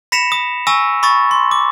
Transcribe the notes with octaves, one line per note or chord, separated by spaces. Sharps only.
B5 A#6 B6 C#7 E7 F7
D#6
G#5 C#6 D#6 E6 A#6
B5 C#6 D#6 A6
C6
D6